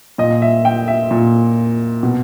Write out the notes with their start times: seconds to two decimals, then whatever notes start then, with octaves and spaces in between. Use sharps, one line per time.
0.18 A#2 D#5
0.42 E5
0.65 G5
0.88 E5
1.11 A#2
2.03 B2